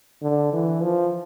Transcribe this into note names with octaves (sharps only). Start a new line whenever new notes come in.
D3
E3
F3